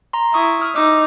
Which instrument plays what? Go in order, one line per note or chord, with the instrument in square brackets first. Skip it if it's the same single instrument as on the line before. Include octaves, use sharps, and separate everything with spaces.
[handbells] A#5 C6
[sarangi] E4 [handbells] C#6 D#6
[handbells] D#6 F6
[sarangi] D#4 [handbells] D6 E6